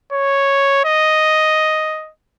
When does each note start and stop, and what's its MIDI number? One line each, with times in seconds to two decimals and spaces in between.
0.13 0.83 73
0.85 2.11 75